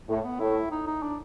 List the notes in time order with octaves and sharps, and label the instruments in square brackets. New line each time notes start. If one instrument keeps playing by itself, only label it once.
[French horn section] A2 [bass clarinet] A3
[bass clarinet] B3
[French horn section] A2 [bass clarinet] E4
[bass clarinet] D#4
D#4
D4